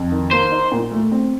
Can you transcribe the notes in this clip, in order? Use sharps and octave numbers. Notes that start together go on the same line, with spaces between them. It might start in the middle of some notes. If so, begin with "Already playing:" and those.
Already playing: F2
D#3
A#3 C5
D#4
A#2
A3
C4